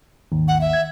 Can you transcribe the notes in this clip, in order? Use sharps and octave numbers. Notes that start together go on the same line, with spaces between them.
G#1 D#2
F#5
E5
G#6